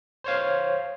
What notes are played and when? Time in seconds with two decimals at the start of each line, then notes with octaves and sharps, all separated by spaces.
0.24 C5 C#5 F5